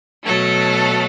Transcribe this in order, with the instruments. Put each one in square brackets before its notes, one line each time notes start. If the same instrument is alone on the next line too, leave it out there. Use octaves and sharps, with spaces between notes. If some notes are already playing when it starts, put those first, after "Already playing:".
[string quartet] B2 F#3 A3 A4